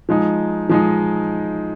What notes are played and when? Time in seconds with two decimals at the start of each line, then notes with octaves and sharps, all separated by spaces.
0.09 F3 G#3 D#4
0.69 F3 G#3 D#4